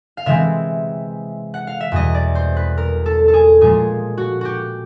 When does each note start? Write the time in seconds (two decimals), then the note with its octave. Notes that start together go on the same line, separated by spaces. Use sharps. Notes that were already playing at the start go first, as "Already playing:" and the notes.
0.17 F5
0.26 C3 E3 G#3 C4 E5
1.54 F#5
1.67 F5
1.80 E5
1.92 E2 B2 G3 B3 D#5
2.15 D5
2.35 C5
2.57 B4
2.78 A#4
3.06 A4
3.28 A4
3.34 G#4
3.61 A#2 F3 G#3 G#4
4.18 F#4
4.41 F#4 G4